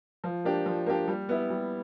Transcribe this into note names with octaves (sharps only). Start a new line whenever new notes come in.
F3
A#3 D4 G4
F3
A#3 D4 G4
G3
B3 E4
G3